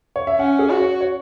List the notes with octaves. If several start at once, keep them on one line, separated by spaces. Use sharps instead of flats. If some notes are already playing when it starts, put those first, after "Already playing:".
C#5
E5
C#4 F#5
G#4
F#4
C#5
C#5